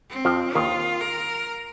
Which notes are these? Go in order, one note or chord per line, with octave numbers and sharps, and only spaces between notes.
C4
F2 F3
D#2 D#3 F4
A#4